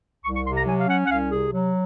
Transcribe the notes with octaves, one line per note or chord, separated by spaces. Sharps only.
C2 C#6
C#6
C3 C6
A#5
F#3 G#5
F5
C#4 F#5
F#5
C2 F5
C3 G#4
F#3